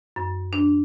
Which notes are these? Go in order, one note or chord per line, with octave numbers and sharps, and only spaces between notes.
F#2
D4